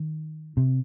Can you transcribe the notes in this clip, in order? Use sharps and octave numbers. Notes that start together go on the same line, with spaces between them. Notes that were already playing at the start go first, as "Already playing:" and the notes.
Already playing: D#3
C3